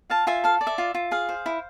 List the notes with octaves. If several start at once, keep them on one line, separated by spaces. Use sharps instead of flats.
F4 F5 A5
F4 E5 G#5
A4 F5
D5
E5
F4
F4
G#4 F5
C5
E4